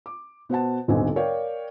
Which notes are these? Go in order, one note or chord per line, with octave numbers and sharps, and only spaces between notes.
D6
B2 C5 F#5 A5
D#1 B1 D3 C4 D#5 G#5
A#4 C#5 D5 F5 G5